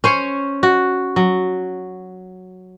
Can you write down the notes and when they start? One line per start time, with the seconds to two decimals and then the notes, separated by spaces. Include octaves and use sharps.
0.04 C#4 C5 C#5
0.63 F#4
1.16 F#3